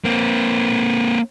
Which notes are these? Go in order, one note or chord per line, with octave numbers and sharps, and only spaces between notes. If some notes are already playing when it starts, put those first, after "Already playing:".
A#3 C4